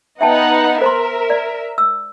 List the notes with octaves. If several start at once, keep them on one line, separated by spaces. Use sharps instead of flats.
B3 D#4 E5 F#5 G5 A5
A#4 C5 E5 A#5 C6
D5
E6